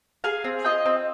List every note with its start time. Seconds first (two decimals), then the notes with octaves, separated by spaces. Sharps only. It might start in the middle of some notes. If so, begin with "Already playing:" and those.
0.24 G#4 F5 G#5
0.44 C4
0.65 F4 D#5 G5
0.86 C4